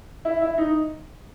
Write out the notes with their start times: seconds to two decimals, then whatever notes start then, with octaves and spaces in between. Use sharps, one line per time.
0.25 E4
0.42 E4
0.58 D#4